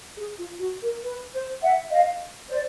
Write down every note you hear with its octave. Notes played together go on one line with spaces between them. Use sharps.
G#4
F4
F#4
A#4
B4
C5
E5 F#5
D#5 F5
C5 D5